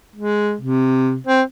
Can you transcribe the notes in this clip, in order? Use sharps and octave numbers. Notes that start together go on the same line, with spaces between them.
G#3
C3
C4